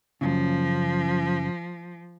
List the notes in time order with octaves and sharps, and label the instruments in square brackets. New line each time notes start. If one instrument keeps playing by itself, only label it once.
[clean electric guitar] F#2 A#2 C#3 [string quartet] F3